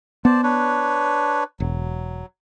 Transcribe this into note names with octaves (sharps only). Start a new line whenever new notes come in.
B3 C5 D5 A5
D4 B4 C#5
E1 F#3